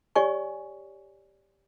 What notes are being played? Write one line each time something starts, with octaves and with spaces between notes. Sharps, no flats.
G4 C#5 D5 G#5 C#6